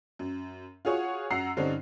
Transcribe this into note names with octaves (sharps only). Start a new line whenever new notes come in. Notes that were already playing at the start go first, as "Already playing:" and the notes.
F#2
F4 F#4 G#4 C#5 F#5
F#2 F#5 A#5 E6 C7
G2 D3 C4 C#4 D#4